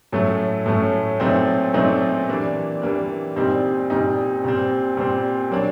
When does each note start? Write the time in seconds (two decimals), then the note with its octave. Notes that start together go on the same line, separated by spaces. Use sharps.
0.13 A2 F#3 A3 C#4
0.66 A2 F#3 A3 C#4
1.20 A#2 F#3 A3 C4 D#4
1.74 A#2 F#3 A3 C4 D#4
2.28 E3 G3 A#3 D4
2.82 E3 G3 A#3 D4
3.36 A#2 G3 C4 D#4
3.90 A#2 G3 C4 D#4
4.44 A#2 G3 C4
4.97 A#2 G3 C4
5.51 F#3 A#3 D4